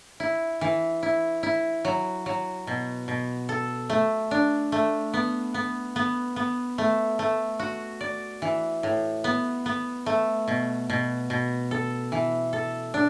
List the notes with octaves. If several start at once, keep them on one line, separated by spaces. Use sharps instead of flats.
E4
E3
E4
E4
F#3
F#3
B2
B2
A4
A3
D4
A3
B3
B3
B3
B3
A3
A3
F#4
D5
E3
A2
B3
B3
A3
B2
B2
B2
A4
E3
A4
D4